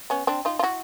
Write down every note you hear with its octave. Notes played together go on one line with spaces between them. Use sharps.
B3 C#4
C4 D4
D#4 F4
F4
E4 F#4